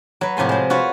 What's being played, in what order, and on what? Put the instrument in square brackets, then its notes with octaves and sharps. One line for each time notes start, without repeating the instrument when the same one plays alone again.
[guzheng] F#3 B4
A2 C3 F3 G#5 C6
G#3 C5
F4 F#4 B4 C#5